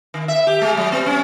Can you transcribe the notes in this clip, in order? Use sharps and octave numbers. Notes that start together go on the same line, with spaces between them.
D#3
E5
G4
G#3
F#3
B3
C#4